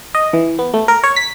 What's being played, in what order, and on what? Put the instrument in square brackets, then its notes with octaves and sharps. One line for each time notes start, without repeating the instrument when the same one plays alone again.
[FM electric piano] D#5
E3
B3
A3
A#4
C#5
B6